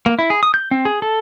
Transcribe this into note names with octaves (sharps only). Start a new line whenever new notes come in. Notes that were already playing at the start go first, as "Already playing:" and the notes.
A#3
E4
G#4
D#6
G6
C4
G#4
A4